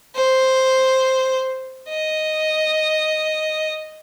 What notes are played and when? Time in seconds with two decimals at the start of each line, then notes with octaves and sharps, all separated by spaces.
0.15 C5
1.89 D#5